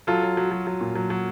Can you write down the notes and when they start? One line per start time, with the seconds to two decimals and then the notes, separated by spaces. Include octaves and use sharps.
0.07 F#3 F4 A4
0.23 F#3
0.37 F#3
0.51 F#3
0.67 F#3
0.81 A#2
0.95 F#3
1.10 F#3